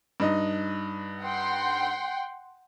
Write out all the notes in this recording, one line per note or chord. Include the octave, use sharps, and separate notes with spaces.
G2 D#4 D#5
F#5 G5 C6